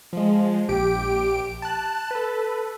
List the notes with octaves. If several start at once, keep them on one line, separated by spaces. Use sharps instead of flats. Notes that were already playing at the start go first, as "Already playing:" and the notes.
F3 G#3
A#1 G4 D7
A5 F#6
A4 B4